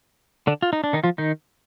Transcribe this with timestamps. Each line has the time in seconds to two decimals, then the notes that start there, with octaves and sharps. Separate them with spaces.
0.47 D3 D4
0.62 F4
0.73 D#4
0.84 D4
0.93 D#3 D#4
1.04 F3 F4
1.18 D#3 D#4